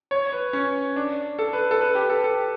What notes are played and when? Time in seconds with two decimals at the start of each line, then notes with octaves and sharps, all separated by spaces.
0.11 C#5
0.33 B4
0.53 C#4
0.96 D4
1.39 A4
1.53 B4
1.71 A4
1.81 B4
1.95 G4
2.10 A4
2.24 A4